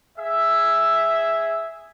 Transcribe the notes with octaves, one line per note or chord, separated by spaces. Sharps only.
G#4 E5